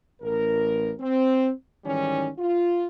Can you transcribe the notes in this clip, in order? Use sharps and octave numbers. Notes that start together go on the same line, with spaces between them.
A1 A#4
C4
G#2 D#3 E3 G3 C#4
F4